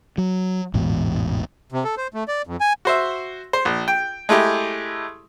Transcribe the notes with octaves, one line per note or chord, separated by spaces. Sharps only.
F#3
A1 E2 G#2 B2
C3
A4
C5
A3
D5
F2
G#5
F#4 C5 E5
C5
A#1
G5
G#3 A3 E4 G4